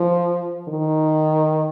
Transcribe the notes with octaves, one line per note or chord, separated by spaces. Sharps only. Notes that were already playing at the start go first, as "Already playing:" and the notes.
Already playing: F3
D#3